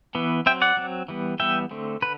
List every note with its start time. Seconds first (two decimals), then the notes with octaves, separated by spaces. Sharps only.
0.15 E3 B3
0.46 F#3 C4 E5 G5
0.62 D5 F#5
0.77 F#3 C4
1.08 E3 G3 B3
1.40 E3 G3 B3 E5 G5
1.71 D3 A3 C4
2.02 D3 B4